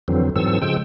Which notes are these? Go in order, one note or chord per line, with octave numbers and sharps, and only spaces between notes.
F2 D3 E3 F#3 C4
G#2 E3 F#3 C4 A4 E6
C#3 F3 G#3 G5 E6